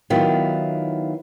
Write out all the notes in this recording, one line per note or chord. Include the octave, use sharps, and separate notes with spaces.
D#3 F#3 B3 E4 F4